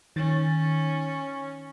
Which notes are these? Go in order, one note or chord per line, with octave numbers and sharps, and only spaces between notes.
D#3 C#4 A6